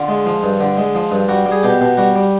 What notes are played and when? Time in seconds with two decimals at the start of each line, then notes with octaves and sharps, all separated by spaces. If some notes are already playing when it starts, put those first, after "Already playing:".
Already playing: D3 F4
0.08 G#3
0.26 F3
0.43 G2
0.60 D3
0.77 G#3
0.95 F3
1.11 G2
1.29 G3 F#4
1.46 G3
1.52 G#4
1.63 B2 G4
1.81 B2
1.98 G3 F#4
2.16 G3